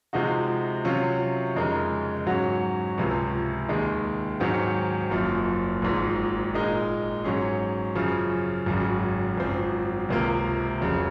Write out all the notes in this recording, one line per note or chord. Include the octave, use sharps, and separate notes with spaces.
C3 F3 G#3 D#4 F#4
C3 F#3 C#4 F4
F2 C#3 G#3 D#4 A#4
G#2 F#3 C#4 F#4
C#2 C3 F3
D#2 D#3 G#3
G#2 D#3 F#3 C4
F#1 F#2 F3
G#1 G#2 F3
A#2 G#3 D#4 A#4
G#2 F#3 C#4 G#4
F#2 C#3 F3
G#1 F#2 C#3
G#1 F#2 F3 C4
C#2 C3 F3 A#3
F1 F2 C#3 F#3